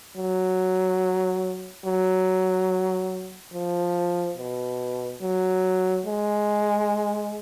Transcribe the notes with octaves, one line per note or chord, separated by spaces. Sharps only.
F#3
F#3
F3
B2
F#3
G#3